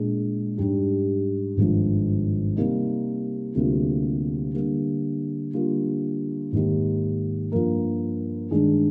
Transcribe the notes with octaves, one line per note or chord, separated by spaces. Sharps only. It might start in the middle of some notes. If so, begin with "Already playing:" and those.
Already playing: A#2 G#3 D4 G#4
G#2 G3 D4 G4
G#1 G2 F3 G#3
C3 G3 A#3 D#4
D2 C3 G3 A#3 F4
D3 G3 A#3
D3 G3 A#3 F4
G#2 D#3 A#3 D#4 G4
G2 F3 A#3 F4 A#4
G2 D#3 G#3 D4 G#4